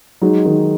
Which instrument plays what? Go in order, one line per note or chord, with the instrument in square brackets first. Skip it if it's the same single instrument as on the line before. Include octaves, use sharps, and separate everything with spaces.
[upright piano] F#3 G#3 [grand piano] D#4
[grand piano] D#3